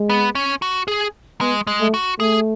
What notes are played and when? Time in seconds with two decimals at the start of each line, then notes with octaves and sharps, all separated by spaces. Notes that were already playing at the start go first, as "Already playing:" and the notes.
Already playing: G#3
0.10 B3
0.35 C#4
0.62 F#4
0.88 G#4
1.41 G#3 B3
1.67 G#3
1.80 A3
1.94 F#4
2.20 A3 G#4